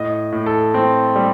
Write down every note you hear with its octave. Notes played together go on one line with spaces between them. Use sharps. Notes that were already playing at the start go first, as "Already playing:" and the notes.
Already playing: A2 D#5
A2
A4
C4
G3